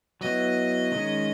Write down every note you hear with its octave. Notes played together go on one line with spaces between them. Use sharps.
F#3 B3 E4 D#5
D#3 G#3 C#4